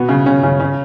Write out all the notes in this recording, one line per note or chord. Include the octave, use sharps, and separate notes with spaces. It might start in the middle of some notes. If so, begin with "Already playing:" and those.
Already playing: B2 B3
C#3 C#4
C#3 C#4
C#3 C#4
C#3 C#4